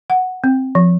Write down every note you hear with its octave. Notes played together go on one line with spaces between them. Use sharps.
F#5
C4
F3